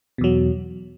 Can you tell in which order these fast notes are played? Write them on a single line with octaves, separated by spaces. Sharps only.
B2 E2 F#3